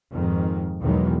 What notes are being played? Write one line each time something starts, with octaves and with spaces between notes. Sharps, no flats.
F2 G#2 D#3
B1 E2 D#3 E3 F#3 G#3